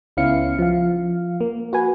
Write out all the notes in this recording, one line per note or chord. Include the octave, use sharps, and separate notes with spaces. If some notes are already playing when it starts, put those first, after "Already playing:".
C#2 B3 C#4 E4 F5 C#7
F3 F5
A#3
F#4 B4 G#5